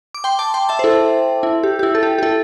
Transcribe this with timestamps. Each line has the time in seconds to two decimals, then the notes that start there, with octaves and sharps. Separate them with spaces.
0.15 D6
0.24 G5 C6
0.39 A5 D6
0.54 G5 C6
0.69 E5 A5
0.79 C5
0.84 E4 A4
1.43 E4
1.63 G4
1.79 G4
1.83 E4
1.95 A4
2.03 G4
2.18 G4
2.23 E4 A4